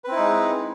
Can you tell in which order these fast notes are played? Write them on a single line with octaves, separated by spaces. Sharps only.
B4 C4 E4 D#4 G#3